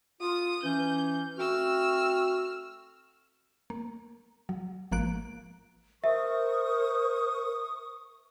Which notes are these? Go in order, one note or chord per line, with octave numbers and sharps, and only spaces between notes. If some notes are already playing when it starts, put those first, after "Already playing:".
F4 D#6
E3 C#4 G6
A3 C4 F#4 E6 F6
A#3
F#3
G#1 F3 A#3 F#6 D7
A#4 C5 E5 C#6 D#6